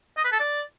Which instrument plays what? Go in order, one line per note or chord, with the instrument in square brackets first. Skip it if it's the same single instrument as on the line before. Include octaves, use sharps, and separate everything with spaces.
[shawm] D#5
B4
A4
D5